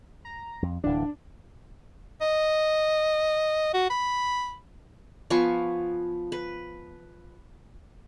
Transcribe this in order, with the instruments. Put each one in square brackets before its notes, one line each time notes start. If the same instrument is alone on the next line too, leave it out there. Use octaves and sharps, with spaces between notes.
[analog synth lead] A#5
[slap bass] F2
[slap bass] D1 E3 [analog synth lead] D4
[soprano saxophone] D#5
F#4
B5
[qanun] F3 B3 G#5 C#6
B4